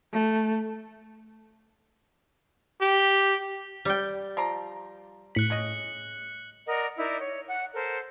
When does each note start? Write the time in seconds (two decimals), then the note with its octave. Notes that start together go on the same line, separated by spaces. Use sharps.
0.13 A3
2.82 G4
3.85 G3 G5
4.37 F3 D5 A#5
5.35 A2 F#6 B6 C#7 F#7
5.50 C#3 D#5
6.67 A#4 D5 D#5 F#5
6.97 D#4 E4 A#4 D5
7.19 C#5
7.48 F#5 F#6
7.74 A4 A#4 C5